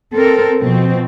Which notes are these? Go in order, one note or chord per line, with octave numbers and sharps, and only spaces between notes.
C4 A4 A#4
B2 F3 C4